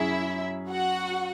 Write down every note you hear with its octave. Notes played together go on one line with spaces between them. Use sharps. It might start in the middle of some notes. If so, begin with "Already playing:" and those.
Already playing: F#2 F#3 C#4 E4 G#4 E5
F#4 F#5